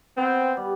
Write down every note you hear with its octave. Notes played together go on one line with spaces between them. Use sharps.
B3 C4
G3